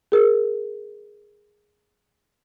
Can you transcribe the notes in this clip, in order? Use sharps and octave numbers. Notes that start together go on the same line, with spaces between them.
G#4 A#4